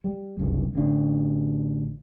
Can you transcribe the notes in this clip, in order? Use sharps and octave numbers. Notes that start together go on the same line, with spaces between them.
G3
F#1 C2 G2
A1 D3 D4